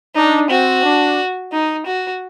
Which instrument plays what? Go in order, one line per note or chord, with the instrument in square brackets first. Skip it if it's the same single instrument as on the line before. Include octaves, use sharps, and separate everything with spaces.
[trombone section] D4 [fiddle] D#4
[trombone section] C4 [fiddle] F#4
[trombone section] D4
[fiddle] D#4
F#4